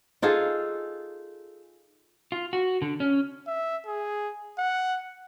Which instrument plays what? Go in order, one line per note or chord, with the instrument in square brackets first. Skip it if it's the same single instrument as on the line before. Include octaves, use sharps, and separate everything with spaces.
[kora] D#4 F4 G#4 A4
[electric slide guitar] F4
F#4
D3
C#4
[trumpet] E5
G#4
F#5